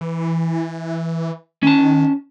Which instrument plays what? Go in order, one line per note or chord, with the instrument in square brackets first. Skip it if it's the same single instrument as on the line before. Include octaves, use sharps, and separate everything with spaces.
[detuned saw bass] E3
[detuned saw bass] D#3 [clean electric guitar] C#4 A5